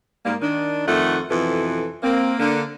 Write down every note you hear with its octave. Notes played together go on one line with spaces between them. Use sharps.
G#2 G3 A#3
D#3 D4
F2 D#3 A3 F#5
F2 B2 E3 A4
A#3 C4
D3 A#3